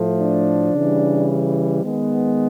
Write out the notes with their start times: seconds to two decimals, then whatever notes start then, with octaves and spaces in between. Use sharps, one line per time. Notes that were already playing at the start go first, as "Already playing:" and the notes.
Already playing: A2 F3 A3
0.19 D4
0.73 C#3 E3 G3
1.83 D#3 G#3 B3